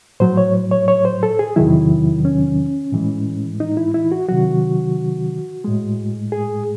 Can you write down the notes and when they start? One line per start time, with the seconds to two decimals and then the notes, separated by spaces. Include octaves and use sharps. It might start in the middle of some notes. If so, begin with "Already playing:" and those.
0.20 A2 F#3 C5
0.37 C#5
0.71 C#5
0.88 C#5
1.05 C5
1.23 A4
1.39 G#4
1.56 E2 C3 D#3 F#3 E4
2.25 C#4
2.92 A2 E3 G#3
3.60 D#4
3.77 E4
3.94 E4
4.12 F#4
4.29 C3 D#3 F#3 F#4
5.64 A2 G#3
6.32 G#4